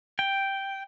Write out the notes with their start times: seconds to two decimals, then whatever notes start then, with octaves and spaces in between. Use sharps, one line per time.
0.19 G5